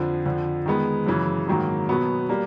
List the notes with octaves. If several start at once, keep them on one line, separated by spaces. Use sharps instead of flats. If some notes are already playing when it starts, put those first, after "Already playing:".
Already playing: F2 D3 F3
F2 D3 F3
D#3 G#3 B3
F#2 C#3 E3
G#2 D#3 F#3 A#3
B2 F#3 B3
G3 A#3